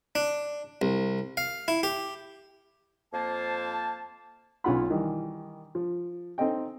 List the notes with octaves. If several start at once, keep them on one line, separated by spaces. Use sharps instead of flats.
D4
C2
F5
E4
G4
F2 A#3 C5 A5
B1 C#4 F4 F#5 B5
D#3 E3 G3
F3
C4 D#4 A4 D#5 G5